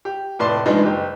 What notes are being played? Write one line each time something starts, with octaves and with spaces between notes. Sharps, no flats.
G4
F1 A2 B4 D5 A5 C6
G2 E3 F3 G#3 D4 D#4
F#1 G4